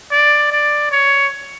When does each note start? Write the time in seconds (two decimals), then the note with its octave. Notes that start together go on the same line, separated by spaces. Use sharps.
0.12 D5
0.52 D5
0.91 C#5